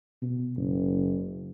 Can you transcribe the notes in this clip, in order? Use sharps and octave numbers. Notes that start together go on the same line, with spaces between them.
B2
F#1